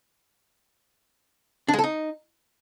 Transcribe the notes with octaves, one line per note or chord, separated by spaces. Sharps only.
D4
G#3
A4
D#4